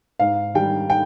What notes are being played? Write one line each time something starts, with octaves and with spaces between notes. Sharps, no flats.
G#2 F5
D#3 G3 G5
G5